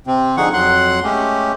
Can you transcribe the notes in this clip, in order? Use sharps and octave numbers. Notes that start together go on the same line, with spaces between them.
C3 C4
D3 F3 D#4 G#4 F#5 C#6
F2 F#3 F#5 C6 F#6
G#3 A3 C#4 G4